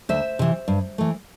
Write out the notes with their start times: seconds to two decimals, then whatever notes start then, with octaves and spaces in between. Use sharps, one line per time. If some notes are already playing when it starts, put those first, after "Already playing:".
0.09 D2 C5 E5
0.39 C3 E3
0.68 G2
0.98 E3 A3